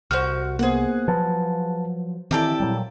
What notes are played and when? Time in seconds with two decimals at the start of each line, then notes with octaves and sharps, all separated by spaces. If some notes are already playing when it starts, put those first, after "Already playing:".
0.11 C2 F#4 C5 F6 G6
0.59 A#3 B3 G#4 C5 F#5
1.08 F3 F#3 B4 A5
2.31 D#3 E3 C4 E4 G4 A4 D5
2.60 A#2 F#3 G3